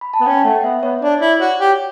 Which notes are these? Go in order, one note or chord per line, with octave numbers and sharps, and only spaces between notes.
B5
A5
B3
C#4 G5
A3 F#5
B3 E5
B3 C#5
D4 D5
E4 D5
F#4 C#5
G4